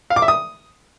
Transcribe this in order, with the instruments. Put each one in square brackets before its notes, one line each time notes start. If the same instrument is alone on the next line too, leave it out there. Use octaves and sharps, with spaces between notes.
[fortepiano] F5
D6
E5
D#6